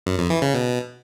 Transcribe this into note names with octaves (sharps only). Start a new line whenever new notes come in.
F#2
F2
E3
C#3
B2